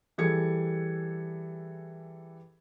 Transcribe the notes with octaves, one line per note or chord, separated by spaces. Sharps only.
E3 G3 G#4 A4 G#6 C#7